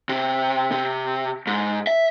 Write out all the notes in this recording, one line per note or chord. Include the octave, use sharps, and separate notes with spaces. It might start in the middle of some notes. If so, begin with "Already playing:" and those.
C3
C3
G#2
E5